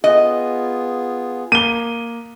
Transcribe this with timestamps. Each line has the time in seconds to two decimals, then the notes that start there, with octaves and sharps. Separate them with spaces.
0.04 B3 F4 G#4 D#5
1.52 A#3 D#7 G7